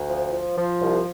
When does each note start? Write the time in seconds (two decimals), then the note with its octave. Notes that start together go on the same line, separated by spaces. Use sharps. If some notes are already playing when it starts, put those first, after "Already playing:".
Already playing: D2
0.10 F3
0.33 F3
0.56 F3
0.80 C2